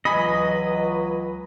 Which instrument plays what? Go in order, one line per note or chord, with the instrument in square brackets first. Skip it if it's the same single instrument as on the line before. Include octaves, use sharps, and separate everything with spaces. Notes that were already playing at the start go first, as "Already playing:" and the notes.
[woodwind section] C#2 E3 F#3 [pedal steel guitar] D#5 [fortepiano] G#5 B5